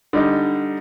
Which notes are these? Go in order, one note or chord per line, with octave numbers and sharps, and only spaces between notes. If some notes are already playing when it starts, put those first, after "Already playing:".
D3 G3 D#4